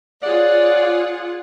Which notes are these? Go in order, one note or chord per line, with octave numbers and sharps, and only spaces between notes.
F4 G#4 C#5 D5 F#5